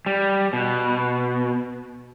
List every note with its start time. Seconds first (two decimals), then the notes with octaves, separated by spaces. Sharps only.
0.06 G3
0.53 B2